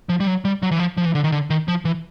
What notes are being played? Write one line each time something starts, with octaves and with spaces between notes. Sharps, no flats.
F3
G3
F#3
G3
F#3
E3
F3
F3
E3
D3
D#3
D3
D#3
F3
E3